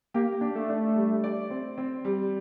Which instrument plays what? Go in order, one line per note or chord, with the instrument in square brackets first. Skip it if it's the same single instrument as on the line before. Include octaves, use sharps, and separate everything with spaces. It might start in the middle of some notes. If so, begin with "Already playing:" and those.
[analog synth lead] A#3 [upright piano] G4
[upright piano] D4
[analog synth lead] A3
[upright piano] D4
G3
D5
C4
C4
G3